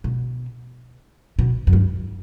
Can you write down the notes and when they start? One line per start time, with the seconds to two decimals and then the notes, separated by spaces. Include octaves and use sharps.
0.04 B2
1.39 B2
1.67 F#2
1.73 G2